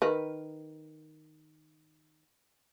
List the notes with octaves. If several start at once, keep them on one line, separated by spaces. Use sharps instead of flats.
D#3 A#4 B4